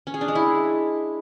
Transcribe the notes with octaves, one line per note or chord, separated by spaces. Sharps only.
C#4
G#4
D4
G#3
E4